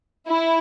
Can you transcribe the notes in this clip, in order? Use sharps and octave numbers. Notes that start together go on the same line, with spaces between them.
E4